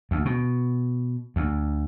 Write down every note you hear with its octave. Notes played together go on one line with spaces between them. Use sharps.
D2
B2
D2